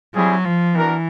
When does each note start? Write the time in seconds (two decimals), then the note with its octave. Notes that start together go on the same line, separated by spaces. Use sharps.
0.15 F#3 G3 C4 E4 G#4
0.45 F3
0.74 E3 B3 D4 F#4 A#4